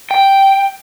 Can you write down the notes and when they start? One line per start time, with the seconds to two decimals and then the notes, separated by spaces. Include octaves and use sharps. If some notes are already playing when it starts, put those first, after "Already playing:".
0.11 G5